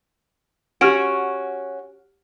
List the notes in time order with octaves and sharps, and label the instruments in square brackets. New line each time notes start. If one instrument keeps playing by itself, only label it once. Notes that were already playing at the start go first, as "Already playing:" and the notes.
[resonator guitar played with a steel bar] C#4 F#4 [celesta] G4 F6 D7